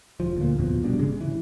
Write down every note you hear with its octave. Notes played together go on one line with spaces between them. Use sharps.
E1 F3
D2 A#2
D1 F2 B2 F3
F1 B2 G3 D4
F1 G#2 C#3 G#3
E3